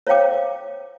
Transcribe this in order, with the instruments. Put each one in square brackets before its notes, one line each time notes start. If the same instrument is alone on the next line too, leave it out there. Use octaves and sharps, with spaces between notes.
[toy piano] C5 C#5 E5 F5 G5 D6